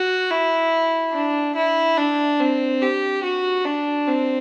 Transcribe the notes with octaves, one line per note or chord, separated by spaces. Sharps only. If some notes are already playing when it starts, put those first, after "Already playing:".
Already playing: F#4
E4
D4
E4
D4
C4
G4
F#4
D4
C4